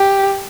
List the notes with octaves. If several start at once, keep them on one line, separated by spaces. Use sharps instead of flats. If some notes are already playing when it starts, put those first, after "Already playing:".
Already playing: G4